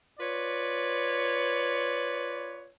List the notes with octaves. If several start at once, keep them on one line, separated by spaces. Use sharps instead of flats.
F4 B4 C#5 D5